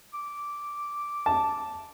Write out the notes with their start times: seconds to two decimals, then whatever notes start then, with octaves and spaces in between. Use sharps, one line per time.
0.14 D6
1.26 A5